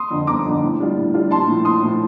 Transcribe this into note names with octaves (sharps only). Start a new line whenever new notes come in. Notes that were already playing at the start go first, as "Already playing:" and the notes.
Already playing: C6 D#6
F2 D3
G1 A#5 D6
F2 D3
A2
G3 D4 F4
A2
G3 D4 F4
A#1 A5 C6
A2 F3
A#1 C6 D#6
A2 F3